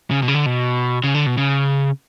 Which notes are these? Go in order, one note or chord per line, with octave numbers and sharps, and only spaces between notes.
C#3
B2
C#3
D3
B2
C#3
D3
B2
C#3